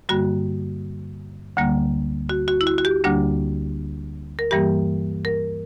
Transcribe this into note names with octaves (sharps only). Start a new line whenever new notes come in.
G2 D3 G3 A#3 F#4
D2 D3 G3 A#3
F#4
F#4
E4
F#4
F#4
G4
D2 D3 G3 A#3 D4
A#4
G2 E3 G3 A#3 G4
A#4